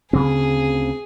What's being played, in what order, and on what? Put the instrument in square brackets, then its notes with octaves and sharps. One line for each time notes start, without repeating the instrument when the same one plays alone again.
[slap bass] D2 C#3 C4 [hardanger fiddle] G#4